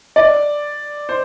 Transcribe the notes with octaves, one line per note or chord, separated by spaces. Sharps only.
D5
C5